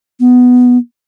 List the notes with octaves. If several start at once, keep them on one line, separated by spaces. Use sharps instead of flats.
B3